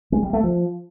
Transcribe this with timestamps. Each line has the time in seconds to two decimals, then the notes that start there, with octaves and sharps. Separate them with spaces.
0.12 G#3
0.23 G3
0.33 A3
0.44 F3